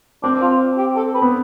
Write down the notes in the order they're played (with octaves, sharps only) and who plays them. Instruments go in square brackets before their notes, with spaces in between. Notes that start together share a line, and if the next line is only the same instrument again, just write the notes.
[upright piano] C4 [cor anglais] D4
[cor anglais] F4
G4
A4
B4
[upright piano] B3